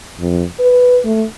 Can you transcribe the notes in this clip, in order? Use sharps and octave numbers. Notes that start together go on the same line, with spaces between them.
F2
B4
A3